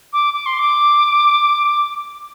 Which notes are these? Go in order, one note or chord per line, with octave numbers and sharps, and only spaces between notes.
D6
D6
C6
D6